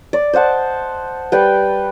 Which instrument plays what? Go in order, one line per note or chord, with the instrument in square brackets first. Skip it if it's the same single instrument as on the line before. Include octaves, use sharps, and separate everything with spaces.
[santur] D5
C5 D#5 F#5 A5
G3 B4 D5 G5